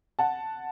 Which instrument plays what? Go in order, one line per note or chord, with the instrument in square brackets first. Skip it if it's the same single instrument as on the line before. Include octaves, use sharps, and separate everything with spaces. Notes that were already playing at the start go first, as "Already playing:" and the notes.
[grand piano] F#5 A5